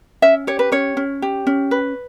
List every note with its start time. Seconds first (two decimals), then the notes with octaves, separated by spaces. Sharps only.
0.22 C#4 E5
0.47 G4 C#5
0.59 B4
0.72 C#4 C#5
0.97 C#4
1.22 G4
1.47 C#4
1.71 B4